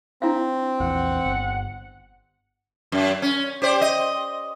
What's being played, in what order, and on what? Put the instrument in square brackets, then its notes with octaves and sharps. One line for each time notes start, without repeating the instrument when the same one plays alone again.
[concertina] C4 [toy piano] D4 E4 F5
[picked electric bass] A#1 E2 [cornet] F#5
[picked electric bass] G1
[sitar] F#2
C#4
G4 C5 D5
D#5